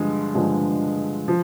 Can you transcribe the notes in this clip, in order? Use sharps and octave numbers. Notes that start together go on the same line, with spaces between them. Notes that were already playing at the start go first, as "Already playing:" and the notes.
Already playing: G2 D3 F3 G#3
G2 D3 F3 G#3
F3